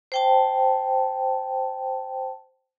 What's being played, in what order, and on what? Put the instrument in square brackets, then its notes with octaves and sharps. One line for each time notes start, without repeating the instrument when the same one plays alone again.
[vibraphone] C5 G5 A5